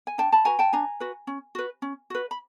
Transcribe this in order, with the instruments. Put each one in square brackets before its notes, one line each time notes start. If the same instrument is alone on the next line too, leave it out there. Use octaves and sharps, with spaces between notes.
[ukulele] G#5
D4 G5 A5
A5 B5
F#4 B4 G#5 A#5
G5 A5
D4 G#5 A#5
F#4 B4
C#4
F#4 B4
C#4
F#4 B4
B5